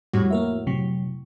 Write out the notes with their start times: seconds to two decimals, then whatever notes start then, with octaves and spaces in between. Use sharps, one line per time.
0.13 F2 A2 G3 F#4
0.30 A#3 A#4 E5
0.67 C3 F#3